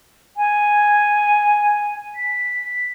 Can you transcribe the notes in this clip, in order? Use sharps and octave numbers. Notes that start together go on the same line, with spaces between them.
G#5
B6